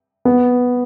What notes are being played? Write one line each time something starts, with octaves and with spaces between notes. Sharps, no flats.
B3